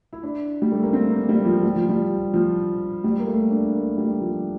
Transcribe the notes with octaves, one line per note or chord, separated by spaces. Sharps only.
E4
D4
G3
A3
A#3
C4
A#3
G3
F3
G3
F3
G3
F3
G3
A#3
A3
D4
A#3
G3
F3